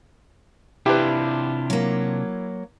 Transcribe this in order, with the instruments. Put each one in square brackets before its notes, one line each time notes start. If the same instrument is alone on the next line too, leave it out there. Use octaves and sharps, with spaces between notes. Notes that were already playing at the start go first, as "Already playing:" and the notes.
[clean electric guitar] C3 D4 F4 [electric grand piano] E4 [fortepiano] G4 B4
[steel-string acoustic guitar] F#3 A#3